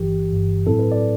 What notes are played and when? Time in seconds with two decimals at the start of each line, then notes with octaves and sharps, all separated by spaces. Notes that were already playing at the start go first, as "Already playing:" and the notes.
Already playing: G1 G2 E3 G4
0.30 G1 G2 E3
0.66 A2 F#3 C4 E4 A4
0.79 B4
0.92 D5